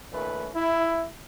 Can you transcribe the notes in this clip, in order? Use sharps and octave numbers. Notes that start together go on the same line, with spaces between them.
A#2 D#3 A3 C#4 B4
E4